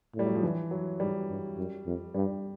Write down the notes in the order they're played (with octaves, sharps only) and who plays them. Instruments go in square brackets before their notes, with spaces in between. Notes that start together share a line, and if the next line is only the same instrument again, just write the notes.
[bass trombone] A2
[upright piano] G3
F#3
F3
E3
F#3
[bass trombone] G#2 [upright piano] G3
[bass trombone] G2
F#2
F2
[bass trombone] G2 [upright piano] G3